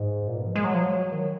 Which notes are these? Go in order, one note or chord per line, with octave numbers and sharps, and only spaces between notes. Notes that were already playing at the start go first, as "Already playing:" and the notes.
Already playing: G#2
A#2
B2
F3
G#3
F#3
F3
F#3
D#3